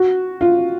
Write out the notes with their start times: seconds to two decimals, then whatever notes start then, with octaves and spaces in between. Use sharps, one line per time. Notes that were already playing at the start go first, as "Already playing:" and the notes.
Already playing: F#4
0.41 F4